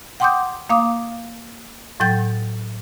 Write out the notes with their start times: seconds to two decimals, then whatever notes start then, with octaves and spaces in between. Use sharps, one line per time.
0.20 F#5 G5 C6 D6 D#6 G6
0.69 A#3 F5 D6 D#6
2.00 A2 F#3 G5 G6 A6